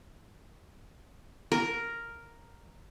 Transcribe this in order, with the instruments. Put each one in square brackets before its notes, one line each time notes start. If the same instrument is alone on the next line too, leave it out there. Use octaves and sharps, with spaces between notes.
[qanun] A#4